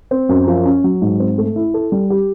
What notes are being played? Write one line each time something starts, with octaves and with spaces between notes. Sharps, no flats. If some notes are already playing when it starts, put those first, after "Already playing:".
C4
F#2
F3
C#4
F#3
G#2
C4
A3
E4
A4
G3
G4